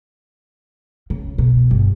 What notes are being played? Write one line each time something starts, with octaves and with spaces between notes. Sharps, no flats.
C#3
B2
G1